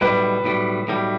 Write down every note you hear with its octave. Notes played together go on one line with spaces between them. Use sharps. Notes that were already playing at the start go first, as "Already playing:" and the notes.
B1 A2 G3 B4
B1 A2 G3
B1 A2 G3